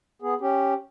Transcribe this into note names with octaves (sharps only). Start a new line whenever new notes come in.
B3 G#4
C#4 G4